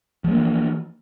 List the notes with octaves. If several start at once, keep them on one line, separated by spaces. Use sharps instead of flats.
E3 F3 G#3 A#3